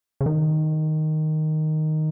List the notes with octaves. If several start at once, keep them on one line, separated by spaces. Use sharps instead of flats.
C#3
D#3